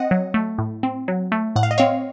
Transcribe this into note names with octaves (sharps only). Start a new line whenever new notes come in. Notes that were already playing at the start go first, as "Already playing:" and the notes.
Already playing: C4 D#5 F#5
F#3
A3
A2
C4
F#3
A3
A2 F#5
F5
D#5
C4 C#5 F5